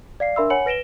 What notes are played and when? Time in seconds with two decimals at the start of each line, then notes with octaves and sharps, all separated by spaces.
0.20 D5 F5 C7
0.36 D4 A#4 E5 B5 C6 E6
0.50 C#5 F#5 G#5 B5 C#7 F#7
0.66 B4 A#6 D7 E7 G7